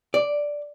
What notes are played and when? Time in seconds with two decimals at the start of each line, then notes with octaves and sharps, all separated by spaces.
0.14 D5